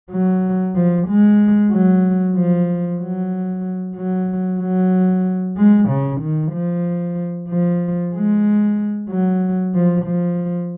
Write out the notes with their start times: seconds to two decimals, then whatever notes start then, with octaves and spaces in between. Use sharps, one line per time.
0.11 F#3
0.76 F3
1.09 G#3
1.72 F#3
2.36 F3
3.01 F#3
3.96 F#3
4.60 F#3
5.57 G#3
5.89 C#3
6.21 D#3
6.53 F3
7.49 F3
8.14 G#3
9.09 F#3
9.75 F3
10.06 F3